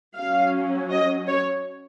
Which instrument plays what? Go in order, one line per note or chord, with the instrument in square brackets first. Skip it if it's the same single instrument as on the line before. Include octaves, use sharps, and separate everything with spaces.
[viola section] F#3 C#4 F5
D#5
C#5